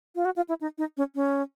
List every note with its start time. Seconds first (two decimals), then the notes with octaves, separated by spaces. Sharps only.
0.15 F4
0.25 F#4
0.36 F4
0.49 E4
0.61 D#4
0.78 D#4
0.97 C#4
1.15 C#4